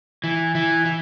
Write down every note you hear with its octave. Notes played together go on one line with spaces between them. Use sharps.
E3
E3
E3